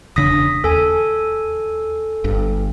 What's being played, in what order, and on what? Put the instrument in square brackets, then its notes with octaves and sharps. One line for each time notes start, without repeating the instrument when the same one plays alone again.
[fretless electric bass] E1 C#3 D4 [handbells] D#6 A#6 B6
[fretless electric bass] D#2 [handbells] A4 G#5
[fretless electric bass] G1 G2